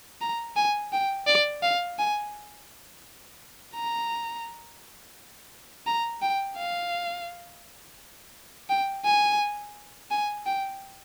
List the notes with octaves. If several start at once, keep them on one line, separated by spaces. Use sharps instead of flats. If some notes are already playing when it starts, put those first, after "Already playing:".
A#5
G#5
G5
D5
F5
G#5
A#5
A#5
G5
F5
G5
G#5
G#5
G5